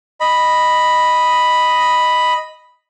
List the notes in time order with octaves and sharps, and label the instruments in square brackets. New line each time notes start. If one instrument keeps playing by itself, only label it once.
[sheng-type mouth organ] D#5 B5